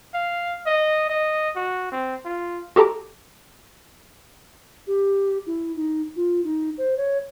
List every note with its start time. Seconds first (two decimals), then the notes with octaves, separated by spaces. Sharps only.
0.14 F5
0.66 D#5
1.09 D#5
1.56 F#4
1.92 C4
2.25 F4
2.76 F#4 G4 A4 A5 A#5 D6
4.87 G4
5.46 E4
5.76 D#4
6.16 F4
6.44 D#4
6.78 C5
6.97 C#5